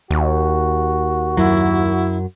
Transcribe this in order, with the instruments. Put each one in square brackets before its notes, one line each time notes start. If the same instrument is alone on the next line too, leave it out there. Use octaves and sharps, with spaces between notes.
[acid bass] D#2 [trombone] F#4
[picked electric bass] F#2 F#3 [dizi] E4